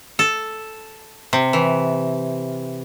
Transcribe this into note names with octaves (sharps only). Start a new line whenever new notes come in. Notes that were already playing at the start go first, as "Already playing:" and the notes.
A4
C3
E3